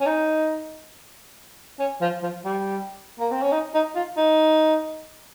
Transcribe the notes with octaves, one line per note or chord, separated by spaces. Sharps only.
C#4
D#4
C#4
F3
F3
G3
A#3
C4
C#4
D#4
D#4
F4
D#4